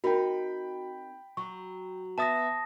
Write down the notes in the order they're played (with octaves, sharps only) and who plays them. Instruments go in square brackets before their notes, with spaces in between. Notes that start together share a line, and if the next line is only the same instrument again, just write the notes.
[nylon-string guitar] C4 D#4 A#4 [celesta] F#4 [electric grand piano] G5 B5
[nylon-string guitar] F#3 [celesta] C#6
[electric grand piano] B3 E5 A6 [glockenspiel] A5 D#6 A#6